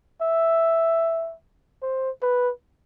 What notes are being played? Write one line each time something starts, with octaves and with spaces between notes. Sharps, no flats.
E5
C5
B4